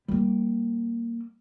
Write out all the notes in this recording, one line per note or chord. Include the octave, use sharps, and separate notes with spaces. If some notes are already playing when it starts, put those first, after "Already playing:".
G3 A#3